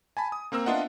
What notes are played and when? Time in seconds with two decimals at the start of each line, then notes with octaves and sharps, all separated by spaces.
0.17 G#5 A5 B5
0.32 D#6
0.52 A#3 C4 A#4 A#5 E6
0.66 B3 D4 F4 D#5 E5 F#5